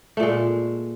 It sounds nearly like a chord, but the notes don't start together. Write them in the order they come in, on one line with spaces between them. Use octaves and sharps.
A3 A#2 G#3